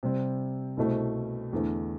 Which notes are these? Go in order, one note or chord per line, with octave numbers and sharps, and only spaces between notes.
C3 G3 C4
C2 B2 A3 C4
E2 D3 A3